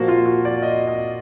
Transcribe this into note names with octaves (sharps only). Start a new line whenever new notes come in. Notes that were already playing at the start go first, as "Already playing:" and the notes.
Already playing: A#2 F3 A#3 F#4
F4
F#4
D5
D#5
D#5